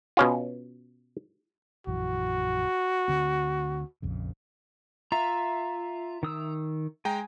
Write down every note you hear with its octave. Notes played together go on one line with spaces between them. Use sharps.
B2 C#4 F4
A#1 F#2 E3 F#4
D2 D3 C4
A#1 F2 C#3
F4 E5 A#5
D#3 D#6 E6
G#3 G5 G#5 A#5